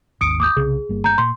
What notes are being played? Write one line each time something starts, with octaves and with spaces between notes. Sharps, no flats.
G#1 D#2 D#6 C#7 D7
D6 D#6 G6
C2 C#3 G#4
G1 G3 A#3
A#5 G6
A#2 C6